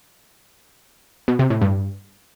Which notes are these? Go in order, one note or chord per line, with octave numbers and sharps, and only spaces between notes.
B2
C3
A2
G2